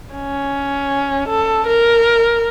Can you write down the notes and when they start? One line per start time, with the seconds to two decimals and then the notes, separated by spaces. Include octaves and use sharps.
0.14 C#4
1.28 A4
1.67 A#4